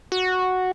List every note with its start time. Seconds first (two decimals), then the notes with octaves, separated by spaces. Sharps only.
0.12 F#4